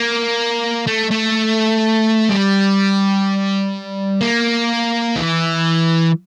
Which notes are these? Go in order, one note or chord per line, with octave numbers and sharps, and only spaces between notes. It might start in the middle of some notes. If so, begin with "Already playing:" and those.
Already playing: A#3
A3
A3
G3
A#3
E3